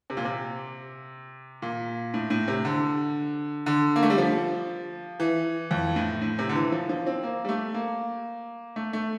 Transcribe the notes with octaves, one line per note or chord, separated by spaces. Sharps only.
C3
A#2
C3
A#2
A2
A2
C3
D3
D3
A#3
A3
G3
F3
E3
F2
A2
A2
C3
D3
E3
F3
F3
C4
A#3
G3
A3
A#3
A3
A3